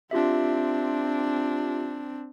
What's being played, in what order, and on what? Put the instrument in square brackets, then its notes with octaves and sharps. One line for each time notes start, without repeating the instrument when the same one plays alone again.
[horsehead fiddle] C4 D4 [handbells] F4 G4 E5